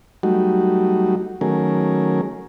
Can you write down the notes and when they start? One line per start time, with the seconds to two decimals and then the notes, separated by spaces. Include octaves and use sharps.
0.23 F#3 G3 A3 D#4 F#4
1.41 D#3 F#3 A3 C#4 G#4 A#4